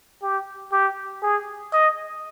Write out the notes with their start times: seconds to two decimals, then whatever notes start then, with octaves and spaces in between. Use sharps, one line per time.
0.22 G4
0.72 G4
1.22 G#4
1.73 D#5